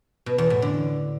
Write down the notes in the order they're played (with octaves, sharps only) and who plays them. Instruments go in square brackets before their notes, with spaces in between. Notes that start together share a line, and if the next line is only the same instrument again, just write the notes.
[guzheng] B2
E2
A2
D3